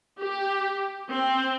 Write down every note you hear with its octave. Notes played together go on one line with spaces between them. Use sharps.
G4
C4